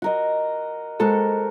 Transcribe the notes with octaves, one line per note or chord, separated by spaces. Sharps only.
F#4 A#4 D#5
G#3 F#4 A4 A#4 C5